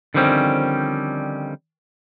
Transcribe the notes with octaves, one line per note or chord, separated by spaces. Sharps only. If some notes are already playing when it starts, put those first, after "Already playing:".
D3 D#3 F3 G3 C4 C#4